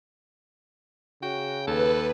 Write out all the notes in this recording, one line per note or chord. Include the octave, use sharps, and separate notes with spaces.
C#3 F#4 G5
D#2 A4 B4